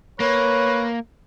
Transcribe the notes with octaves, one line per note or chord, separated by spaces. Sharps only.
A#3 B4 C#5